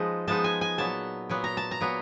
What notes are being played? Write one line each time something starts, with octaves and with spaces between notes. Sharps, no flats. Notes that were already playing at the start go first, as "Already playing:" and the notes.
Already playing: F3 G#3 B3 D#4
F3 G#3 B3 D#4 A5
G#5
G#5
A#2 F#3 B3 A5
A#2 F#3 B3
A#5
A5
A#5
A#2 F#3 B3